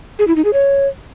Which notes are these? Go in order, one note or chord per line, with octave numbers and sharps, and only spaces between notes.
G#4
E4
D#4
G#4
C#5